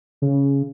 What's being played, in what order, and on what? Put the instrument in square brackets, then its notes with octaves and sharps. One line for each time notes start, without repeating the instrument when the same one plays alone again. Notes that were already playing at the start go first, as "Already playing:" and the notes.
[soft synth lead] C#3